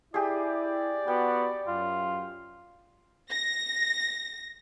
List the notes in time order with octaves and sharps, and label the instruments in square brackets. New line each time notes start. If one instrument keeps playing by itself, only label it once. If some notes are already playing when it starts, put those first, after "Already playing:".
[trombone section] E4 [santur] G4 G#4 [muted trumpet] D5
[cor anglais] B3 [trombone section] F#4 [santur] G5
[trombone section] F#2 [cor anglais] F4
[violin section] A#6